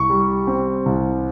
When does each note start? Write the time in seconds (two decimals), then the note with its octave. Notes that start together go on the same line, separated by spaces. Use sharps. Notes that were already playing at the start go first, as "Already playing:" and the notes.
Already playing: C2 C#6
0.10 G3
0.47 C4
0.86 C2